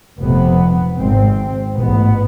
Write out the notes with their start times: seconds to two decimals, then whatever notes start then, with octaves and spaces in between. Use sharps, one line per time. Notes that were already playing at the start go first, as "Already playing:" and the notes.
0.19 F1 F2 C3 B3
0.97 G#1 G#2 C4
1.75 A1 G#2 B3